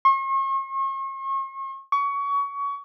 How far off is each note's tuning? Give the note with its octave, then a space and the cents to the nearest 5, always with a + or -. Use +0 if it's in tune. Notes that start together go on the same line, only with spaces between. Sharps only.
C#6 -45
C#6 +25